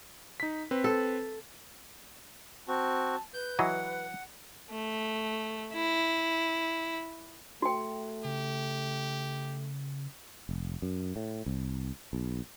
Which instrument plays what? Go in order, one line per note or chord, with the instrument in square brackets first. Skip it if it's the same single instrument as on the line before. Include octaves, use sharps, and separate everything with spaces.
[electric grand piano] D#4 B6
C4 B4
[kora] A4
[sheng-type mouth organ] C4 F#4 [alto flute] A5
[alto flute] B4 [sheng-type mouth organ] G6
[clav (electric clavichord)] E3 F#3 D#5 [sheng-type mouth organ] F#5
[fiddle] A3
E4
[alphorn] A3 [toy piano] F#4 G5
[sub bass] C#3 [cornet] G4
[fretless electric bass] F1
F#2
A2
C2
B1